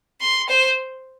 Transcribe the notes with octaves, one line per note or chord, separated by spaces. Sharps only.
C6
C5